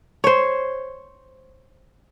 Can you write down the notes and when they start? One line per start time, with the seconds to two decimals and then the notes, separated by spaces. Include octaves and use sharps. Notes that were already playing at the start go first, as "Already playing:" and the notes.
0.24 C5 C#5